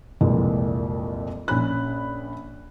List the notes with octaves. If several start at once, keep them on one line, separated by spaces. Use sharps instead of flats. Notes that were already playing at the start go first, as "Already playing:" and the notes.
C2 F2 A#2 E3 G#3
A#1 C#4 B5 F#6